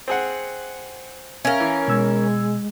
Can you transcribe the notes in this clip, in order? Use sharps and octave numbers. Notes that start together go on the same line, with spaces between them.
C4 G#4 F#5
C#4 A#4 E5 F5
E3
B2 G#3 E6 G#6